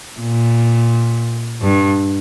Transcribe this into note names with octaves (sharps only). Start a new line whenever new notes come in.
A#2
G2